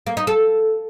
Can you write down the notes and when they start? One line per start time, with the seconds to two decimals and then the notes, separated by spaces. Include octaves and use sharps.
0.07 A#3
0.17 D#4
0.27 A4